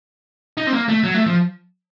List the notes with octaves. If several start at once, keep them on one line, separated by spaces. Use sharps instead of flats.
D#4
C4
A#3
A3
F#3
A3
F3